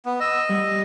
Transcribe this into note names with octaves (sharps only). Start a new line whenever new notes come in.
B3
D#5 E6
G3